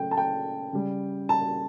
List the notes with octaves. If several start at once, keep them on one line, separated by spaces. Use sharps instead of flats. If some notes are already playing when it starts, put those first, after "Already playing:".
Already playing: C#3 F#3 A3 G5
A5
G5
C#3 G3
A5